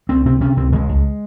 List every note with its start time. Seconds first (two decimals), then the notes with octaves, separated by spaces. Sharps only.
0.09 C#2 C4
0.26 C3 C4
0.41 C3 C#4
0.57 C#2 C4
0.72 C#2 G#3
0.89 C#2